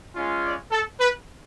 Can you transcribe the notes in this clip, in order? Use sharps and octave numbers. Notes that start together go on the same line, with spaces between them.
G#3 C#4 F4
D5
A4
B4